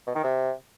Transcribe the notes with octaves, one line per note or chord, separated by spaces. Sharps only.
B2
D#3
C3